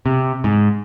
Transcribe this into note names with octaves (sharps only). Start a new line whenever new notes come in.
C3
G#2